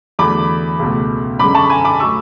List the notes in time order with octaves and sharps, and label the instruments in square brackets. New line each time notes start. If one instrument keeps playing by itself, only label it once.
[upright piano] E2 D3 F#3 A3 B5 D6
C#2 B2 A3
F#2 D3 G#3 B5 D6
A5 C#6
G#5 B5
B5 D6
F#3 A3 C#6 E6